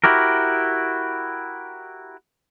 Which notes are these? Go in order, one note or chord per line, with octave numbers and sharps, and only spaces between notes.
E4 F#4 G4 A#4